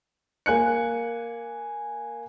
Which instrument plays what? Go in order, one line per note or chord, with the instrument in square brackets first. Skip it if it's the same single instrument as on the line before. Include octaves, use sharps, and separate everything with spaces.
[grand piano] A#3 G#5 F#6 C#7